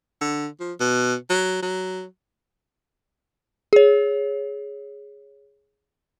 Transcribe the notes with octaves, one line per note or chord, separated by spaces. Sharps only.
D3
F3
B2
F#3
F#3
G#4 C#5